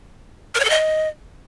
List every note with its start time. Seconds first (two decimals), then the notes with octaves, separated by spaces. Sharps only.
0.55 A#4
0.60 C#5
0.65 A4
0.70 D#5